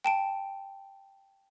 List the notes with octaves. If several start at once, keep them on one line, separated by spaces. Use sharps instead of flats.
G5 A5 D7